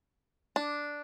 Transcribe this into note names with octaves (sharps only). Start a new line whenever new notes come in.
D4